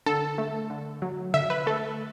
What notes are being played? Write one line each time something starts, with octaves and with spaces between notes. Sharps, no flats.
D3 A4
A3
D3
F#3
D3 E5
B4
A3 A4